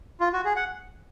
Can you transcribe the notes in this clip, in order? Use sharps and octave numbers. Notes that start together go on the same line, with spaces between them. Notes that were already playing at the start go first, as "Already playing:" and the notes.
F4
F#4
G#4
F#5